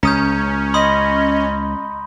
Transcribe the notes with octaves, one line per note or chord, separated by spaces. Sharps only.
C#2 C#4 A#5 D#6 G6
D#5 B5 C6 D#6